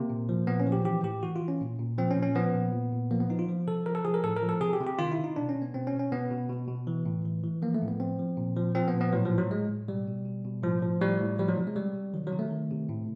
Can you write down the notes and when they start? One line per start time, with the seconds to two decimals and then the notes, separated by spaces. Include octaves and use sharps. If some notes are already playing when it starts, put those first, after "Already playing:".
Already playing: C3 A#3
0.10 A#2
0.29 F3
0.47 A#2 B3
0.60 C#4
0.67 F3
0.72 G4
0.85 E3 G4
1.03 A2 G4
1.23 E3 F#4
1.36 F4
1.41 E3
1.48 C#4
1.60 A#2
1.79 A#2
1.98 F3 C4
2.11 C#4
2.17 A#2
2.23 C#4
2.35 F3 B3
2.55 A#2
2.72 A#2
2.92 A#2
3.11 F3 A#3
3.20 B3
3.29 F3 D#4
3.39 F4
3.48 F3
3.67 C3 A4
3.86 F3 A#4
3.95 A4
4.05 F3 G#4
4.14 A#4
4.24 A2 A4
4.37 A#4
4.43 F3
4.49 A4
4.61 C3 G#4
4.73 G4
4.80 C3
4.87 G4
4.99 D#3 F4
5.12 E4
5.18 C3
5.24 D#4
5.36 B2 D4
5.49 C#4
5.56 B2
5.62 B3
5.74 B2 C4
5.87 C#4
5.93 B2
5.99 C#4
6.12 B2 B3
6.31 B2
6.49 B2
6.68 B2
6.87 E3
7.06 A2
7.25 E3
7.43 E3
7.62 F3 A#3
7.74 A3
7.82 A2
7.88 B3
8.00 F3 C4
8.19 F3
8.37 A#2
8.56 F3
8.75 F3 C4
8.88 B3
8.94 A#2
9.01 B3
9.13 A2 F#3
9.25 F3
9.31 A2
9.38 F#3
9.50 A2 G#3
9.69 A2
9.88 B2 G3
10.07 B2
10.26 B2
10.45 B2
10.63 A2 F3
10.82 F3
11.00 A2 G3
11.21 A2
11.39 F3 G3
11.49 F#3
11.58 C3
11.67 G#3
11.76 C3 G3
11.95 C3
12.14 D#3 F#3
12.27 F#3
12.33 C3
12.39 A3
12.51 D#3
12.71 C3
12.89 A2